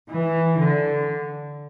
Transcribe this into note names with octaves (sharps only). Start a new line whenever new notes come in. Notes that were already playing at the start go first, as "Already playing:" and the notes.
E3
D3